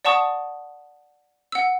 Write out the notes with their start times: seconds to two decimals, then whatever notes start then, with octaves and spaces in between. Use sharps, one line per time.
0.05 D5 F#5 A5 C#6 D#6
1.52 F#5 E6